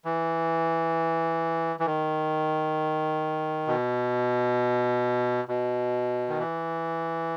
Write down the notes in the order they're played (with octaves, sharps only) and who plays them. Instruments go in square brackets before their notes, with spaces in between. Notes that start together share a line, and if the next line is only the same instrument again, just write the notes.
[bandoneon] E3
E3
D#3
B2
B2
D#3
E3